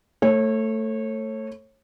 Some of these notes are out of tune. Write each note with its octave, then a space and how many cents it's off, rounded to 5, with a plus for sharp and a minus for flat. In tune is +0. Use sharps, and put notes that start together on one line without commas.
A3 +15 C#5 -30